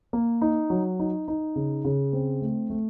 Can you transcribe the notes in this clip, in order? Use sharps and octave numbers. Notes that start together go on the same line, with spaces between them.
A#3
D#4
F#3
D#4
D#4
C#3
C#3
C4
A3
A3